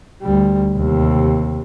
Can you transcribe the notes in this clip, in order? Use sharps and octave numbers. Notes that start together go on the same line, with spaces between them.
D2 G3
D#2 C3